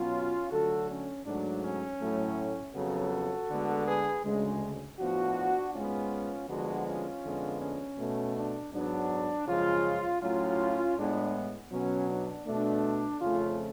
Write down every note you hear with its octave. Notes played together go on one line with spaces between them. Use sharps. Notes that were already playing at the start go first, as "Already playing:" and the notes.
Already playing: B2 F#3 B3 C#4 F4
D2 D3 F#3 A3 F#4 A4
C#4
G#2 F#3 A3 D4
C#4
A2 F#3 A3
F2 C#3 F#3 B3 F#4 A4
D2 D3 G#3 B3
G#4 B4
D2 C#3 G#3
A2 F3 B3 D4 F#4
G#2 G#3 B3 C#4 F4
D2 D3 F3 G#3 B3 D4 F#4
C#4 F4
F2 D3 G#3 B3
C#4
B2 A3
D4
G#2 F#3 B3 D4
F#2 C#3 F3 G#3 C#4 F4
A2 F#3 A3 C#4 F4
A2 G#3 B3 D4
B2 F#3 B3 C#4
D4
B2 A3 D4
F2 C#3 F3 A3 C#4 F4